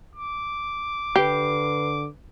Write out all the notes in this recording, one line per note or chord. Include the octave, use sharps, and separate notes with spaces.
D6
D3 G4 B4 C7